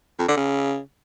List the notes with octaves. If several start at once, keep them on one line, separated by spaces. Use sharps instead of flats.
F2
D3
C#3